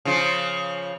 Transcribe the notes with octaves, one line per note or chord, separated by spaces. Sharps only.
C#3 F3 F4